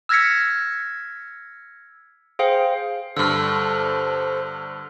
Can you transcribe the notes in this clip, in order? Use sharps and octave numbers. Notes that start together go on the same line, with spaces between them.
E6 F6 G#6 A#6 B6 C#7
G#4 C5 F5 G5
G2 D3 A4 C5 E6 F6